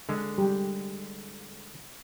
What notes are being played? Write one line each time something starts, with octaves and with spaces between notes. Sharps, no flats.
D3 G#3
G3 G4